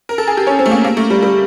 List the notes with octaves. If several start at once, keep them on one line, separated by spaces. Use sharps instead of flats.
A#4
A4
G#4
G4
C#4
C4
A3
A#3
A#3
A3
G3
G3